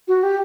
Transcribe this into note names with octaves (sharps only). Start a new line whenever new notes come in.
F#4
G4